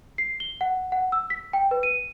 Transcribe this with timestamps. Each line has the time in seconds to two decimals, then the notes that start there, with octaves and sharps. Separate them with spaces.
0.18 C7
0.40 G7
0.61 F#5
0.92 F#5
1.12 E6
1.30 B6
1.53 G5
1.71 B4
1.83 D#7